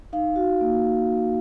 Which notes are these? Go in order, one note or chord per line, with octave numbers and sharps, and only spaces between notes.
D#4 F5
F#4
A#3